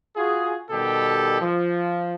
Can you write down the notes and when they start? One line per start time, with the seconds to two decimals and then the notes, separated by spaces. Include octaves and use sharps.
0.16 F4 F#4 G#4
0.70 B2 D#3 G3 G4 A4
1.41 F3